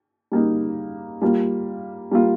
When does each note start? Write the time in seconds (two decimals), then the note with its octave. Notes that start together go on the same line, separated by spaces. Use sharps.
0.32 G3 A#3 D#4
1.22 G3 A#3 F4
2.11 G3 A#3 F4